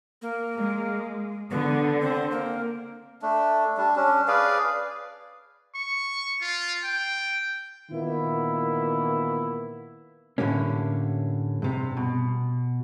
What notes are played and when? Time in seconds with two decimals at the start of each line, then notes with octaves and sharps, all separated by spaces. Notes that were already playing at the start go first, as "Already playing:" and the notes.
0.22 A#3
0.56 G#3
1.51 D3 B3
2.01 C4
2.31 A#3
3.22 A3 D4
3.78 G3 D4
3.96 C#4 D4
4.28 G#4 B4 D5 F5
5.75 C#6
6.41 F4
6.84 G5
7.91 A#2 D#3 E3 A#3 B3 E4
10.38 A2 D3 G3 A#3 C#4
11.62 G2 C3
11.97 B2